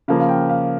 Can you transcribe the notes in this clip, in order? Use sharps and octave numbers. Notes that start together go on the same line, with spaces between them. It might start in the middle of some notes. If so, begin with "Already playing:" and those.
C#3 F3 A#3 F5
F5
G5
F5